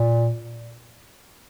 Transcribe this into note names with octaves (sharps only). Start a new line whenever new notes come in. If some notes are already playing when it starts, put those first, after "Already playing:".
Already playing: A#2